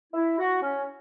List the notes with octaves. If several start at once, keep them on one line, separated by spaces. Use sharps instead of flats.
E4
F#4
C#4